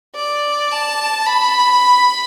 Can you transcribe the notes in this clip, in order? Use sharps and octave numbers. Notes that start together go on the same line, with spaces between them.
D5
A5
B5